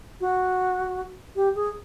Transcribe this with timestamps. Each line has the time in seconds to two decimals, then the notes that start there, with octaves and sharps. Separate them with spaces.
0.21 F#4
1.36 G4
1.55 G#4